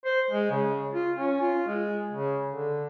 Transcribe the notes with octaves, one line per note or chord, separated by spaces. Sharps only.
C5
G#3
C#3
F4
C#4
F4
G#3
C#3
D3